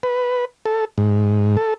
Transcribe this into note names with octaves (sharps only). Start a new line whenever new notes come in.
B4
A4
G#2
A4